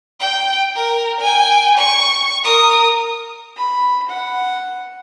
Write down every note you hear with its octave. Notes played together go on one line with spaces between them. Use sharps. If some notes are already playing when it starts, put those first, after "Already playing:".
G5
A#4
G5 G#5
C#6
A#4 D#6
B5
F#5